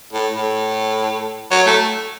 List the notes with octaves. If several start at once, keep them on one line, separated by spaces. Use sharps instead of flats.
A2
A2
F#3
A3